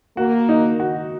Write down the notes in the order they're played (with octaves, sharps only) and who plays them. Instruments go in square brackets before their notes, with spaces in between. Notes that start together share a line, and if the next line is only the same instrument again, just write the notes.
[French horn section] A#3 [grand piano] F#4
[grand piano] D#4
F#4